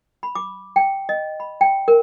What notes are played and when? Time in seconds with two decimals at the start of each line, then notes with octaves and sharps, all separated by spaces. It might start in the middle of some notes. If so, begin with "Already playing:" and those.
0.23 B5
0.35 D6
0.76 G5
1.09 D#5
1.40 B5
1.61 G5
1.88 A#4